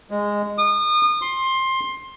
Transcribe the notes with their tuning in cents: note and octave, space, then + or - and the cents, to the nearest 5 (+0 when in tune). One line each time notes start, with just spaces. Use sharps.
G#3 -10
D#6 -30
C6 +15